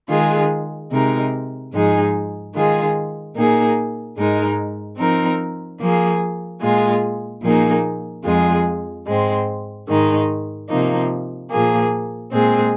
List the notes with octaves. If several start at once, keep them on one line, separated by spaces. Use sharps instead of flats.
D#3 G#3 F4 G#4
C3 G#3 D#4 A#4
G#2 F3 G#3 D#4 G#4
D#3 G#3 F4 G#4
A#2 A#3 D#4 G#4
G#2 G#3 D#4 A#4
F3 C4 D#4 A#4
F3 A#3 G#4
A#2 G#3 F4 G#4
A#2 F3 A#3 D#4 G#4
F2 F3 G#3 F4 G#4
G#2 G#3 C4
G#2 D#3 G#3 D#4
C3 F3 A#3 D#4
A#2 F3 A#3 G#4
A#2 G#3 C4 G#4